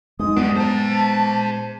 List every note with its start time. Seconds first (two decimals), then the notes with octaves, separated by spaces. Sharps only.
0.19 G#3 D#4 D#6
0.37 F#2 B3 D4
0.56 C5 A5 A#5